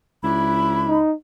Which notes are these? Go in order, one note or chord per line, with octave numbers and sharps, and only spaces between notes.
C#2 F#3 D4 E4 B5
D#4